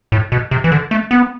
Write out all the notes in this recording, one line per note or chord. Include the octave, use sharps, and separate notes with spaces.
A2
B2
C3
E3
D3
A3
B3